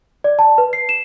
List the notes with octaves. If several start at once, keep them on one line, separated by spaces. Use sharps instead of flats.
D5
A5
B4
C7
E7